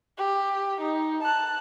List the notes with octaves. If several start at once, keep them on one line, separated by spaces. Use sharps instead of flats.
G4
D#4
A5 F#6